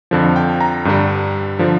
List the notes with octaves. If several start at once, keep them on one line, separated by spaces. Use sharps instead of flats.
F2 D3 F3
G5
A#5
G2 D3 G3
D3 F3